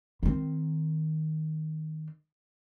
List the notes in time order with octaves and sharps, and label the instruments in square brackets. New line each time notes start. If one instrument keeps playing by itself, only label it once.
[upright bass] D#3 C4